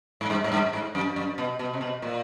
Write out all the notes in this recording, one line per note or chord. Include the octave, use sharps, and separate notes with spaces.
G#2
G2
G#2
G2
G#2
F#2
F#2
B2
B2
C3
B2
A#2